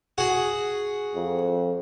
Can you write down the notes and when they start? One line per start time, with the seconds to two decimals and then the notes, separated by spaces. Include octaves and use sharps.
0.18 F#4 G#4 F#5
1.15 F2